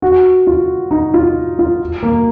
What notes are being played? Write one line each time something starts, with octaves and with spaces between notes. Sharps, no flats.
F#4
F4
D#4
F4
F4
A#3